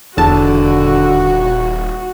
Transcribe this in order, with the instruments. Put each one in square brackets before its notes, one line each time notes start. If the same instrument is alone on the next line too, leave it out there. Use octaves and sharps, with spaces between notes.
[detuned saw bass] D#1 [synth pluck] E2 A5 [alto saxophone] D3 [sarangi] F#4